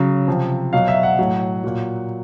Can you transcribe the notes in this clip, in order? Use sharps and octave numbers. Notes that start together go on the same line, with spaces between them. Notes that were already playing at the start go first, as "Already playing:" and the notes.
Already playing: C#3 F#3
C3 F3
B2 F#3 F5
E5
F#5
A2 F#3
A#2 F#3